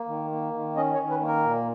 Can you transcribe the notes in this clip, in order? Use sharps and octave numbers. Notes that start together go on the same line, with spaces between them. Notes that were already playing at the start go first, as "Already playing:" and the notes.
Already playing: A#3
D#3
A#3
D#3
C#4 D#5
C#5
D#3
B4
A#3
A#4
A#2